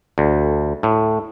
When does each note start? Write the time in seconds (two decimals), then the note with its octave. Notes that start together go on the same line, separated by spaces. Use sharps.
0.18 D2
0.83 A2